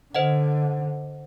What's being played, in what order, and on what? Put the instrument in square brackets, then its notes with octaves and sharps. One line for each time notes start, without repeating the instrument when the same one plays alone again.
[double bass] D3 [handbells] C5 D#5 F#5